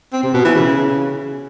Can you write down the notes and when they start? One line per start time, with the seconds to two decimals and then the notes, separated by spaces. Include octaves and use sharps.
0.13 C4
0.24 C3
0.34 B2
0.45 E3
0.55 C#3